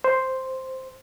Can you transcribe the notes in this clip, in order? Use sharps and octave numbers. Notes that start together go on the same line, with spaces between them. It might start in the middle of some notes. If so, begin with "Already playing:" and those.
C5